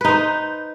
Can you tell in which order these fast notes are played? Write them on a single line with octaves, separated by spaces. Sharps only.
B4 D#4 C5